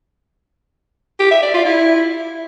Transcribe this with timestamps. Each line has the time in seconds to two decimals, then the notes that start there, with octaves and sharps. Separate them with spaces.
1.20 G4
1.31 E5
1.42 D5
1.54 F4
1.65 E4